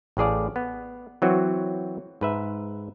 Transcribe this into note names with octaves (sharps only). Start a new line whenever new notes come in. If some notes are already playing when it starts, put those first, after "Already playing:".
A1 A2 G#4 D5 F5
B3
E3 F#3 C4 F#4
G#2 B4 E5